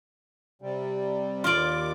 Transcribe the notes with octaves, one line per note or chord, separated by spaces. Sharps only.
C3 G3
D#2 F4 D5 D6